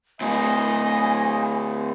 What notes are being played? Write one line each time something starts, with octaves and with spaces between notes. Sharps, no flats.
D2 A2 D#5 G#5